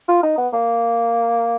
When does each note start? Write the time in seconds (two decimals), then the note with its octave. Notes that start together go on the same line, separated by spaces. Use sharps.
0.08 F4
0.23 D#4
0.37 B3
0.53 A#3